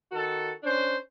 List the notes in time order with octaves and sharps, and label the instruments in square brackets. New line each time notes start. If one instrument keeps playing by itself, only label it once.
[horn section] D#3 F#4 A4
C#4 D4 C5